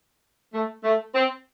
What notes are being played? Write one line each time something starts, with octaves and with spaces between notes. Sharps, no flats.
A3
A3
C4